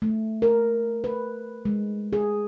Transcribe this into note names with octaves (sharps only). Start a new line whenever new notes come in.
A3
A#4
B4
G#3
G#4